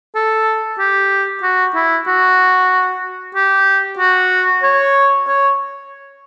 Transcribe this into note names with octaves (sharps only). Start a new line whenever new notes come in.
A4
G4
F#4
E4
F#4
G4
F#4
C#5
C#5